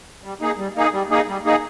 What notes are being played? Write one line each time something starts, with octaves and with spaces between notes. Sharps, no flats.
G3
A#3 D#4 G#4
G3
A#3 D#4 G#4
G3
A#3 D#4 G#4
G3
A#3 D#4 G#4